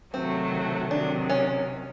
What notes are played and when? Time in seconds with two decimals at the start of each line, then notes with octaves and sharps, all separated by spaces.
0.14 C3 D#3 F#3 A3 C4
0.91 C3 D#3 F#3 D4
1.30 C#4